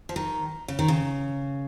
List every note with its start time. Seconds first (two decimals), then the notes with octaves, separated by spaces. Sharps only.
0.09 F3
0.16 D#3
0.68 C#3
0.79 D#3
0.88 C#3